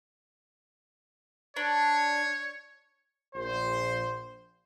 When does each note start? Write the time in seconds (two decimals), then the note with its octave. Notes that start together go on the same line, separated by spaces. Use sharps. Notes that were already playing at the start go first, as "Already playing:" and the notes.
1.56 D4 C#5
3.35 A#1 C5